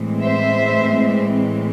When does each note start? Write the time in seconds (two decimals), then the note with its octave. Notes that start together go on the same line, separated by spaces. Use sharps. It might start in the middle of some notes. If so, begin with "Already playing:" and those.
Already playing: A2 E3 G#3 C4
0.22 C5 E5